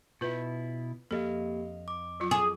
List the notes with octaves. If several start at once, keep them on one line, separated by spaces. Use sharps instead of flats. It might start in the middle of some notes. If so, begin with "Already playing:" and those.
B2 E4 F4 B4
F2 A#3 G4 A4 D#5 F5
D6
F#3 F4
G#4